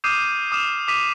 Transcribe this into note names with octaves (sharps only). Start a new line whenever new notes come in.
D6 D#6 F6 G6 C7 D#7
D6 D#6 F6 E7
D6 D#6 B6 D#7 F7